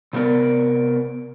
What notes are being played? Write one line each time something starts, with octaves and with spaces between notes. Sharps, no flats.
C3 A3 B3 A#4 D5